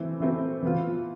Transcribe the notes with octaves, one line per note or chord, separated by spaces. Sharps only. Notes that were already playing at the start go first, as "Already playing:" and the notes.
Already playing: E3 A3 C4 E4
E3 A3 C4 E4
E3 B3 F4